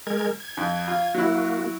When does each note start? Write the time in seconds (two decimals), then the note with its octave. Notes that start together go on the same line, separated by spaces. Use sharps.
0.07 G#3 A#4 G#6
0.40 G#6
0.57 F2
0.88 F4
1.14 F#3 A#3 E4 F#4